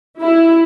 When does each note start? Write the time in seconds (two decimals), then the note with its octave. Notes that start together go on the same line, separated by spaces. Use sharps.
0.20 E4